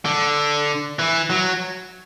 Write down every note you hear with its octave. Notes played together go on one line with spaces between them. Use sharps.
D3
E3
F#3